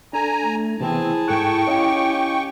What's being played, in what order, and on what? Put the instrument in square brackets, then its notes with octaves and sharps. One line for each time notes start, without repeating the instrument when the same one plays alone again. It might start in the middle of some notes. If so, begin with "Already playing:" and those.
[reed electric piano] D4 A4 [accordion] G#5 A#5
[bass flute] A3
[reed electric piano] C3 E3 B3 [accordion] C4 [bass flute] E4 [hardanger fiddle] G#4 A5
[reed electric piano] G#2 A4 F#6 [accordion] G5 C#6
[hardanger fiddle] C#4 G4 [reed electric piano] C#5 D#5 F5